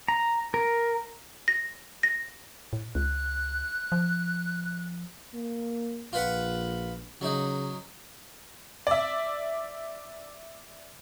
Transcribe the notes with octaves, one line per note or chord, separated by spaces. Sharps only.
A#5
A#4
A#6
A#6
A2
C#2 F#6
F3
A#3
A#1 F4 B4 F#5
C#3 F#3 D#4
D5 E5